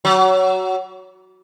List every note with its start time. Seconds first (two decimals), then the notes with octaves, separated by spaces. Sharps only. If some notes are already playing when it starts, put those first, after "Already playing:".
0.05 F#3